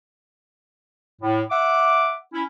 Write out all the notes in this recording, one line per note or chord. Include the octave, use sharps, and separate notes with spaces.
A2
E5 F#5 D6
C#4 E4